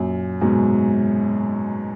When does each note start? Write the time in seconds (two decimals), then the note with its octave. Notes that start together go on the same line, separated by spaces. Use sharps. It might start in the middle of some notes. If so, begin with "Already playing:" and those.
Already playing: F#2 A#2
0.42 G#2 B2